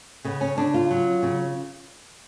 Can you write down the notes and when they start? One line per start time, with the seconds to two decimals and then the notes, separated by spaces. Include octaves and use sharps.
0.25 C#3 B3
0.41 C#4
0.57 C#3 D4
0.74 F4
0.91 F#3
1.22 C#3